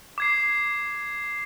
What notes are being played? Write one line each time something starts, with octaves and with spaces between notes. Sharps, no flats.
D6 G#6 C7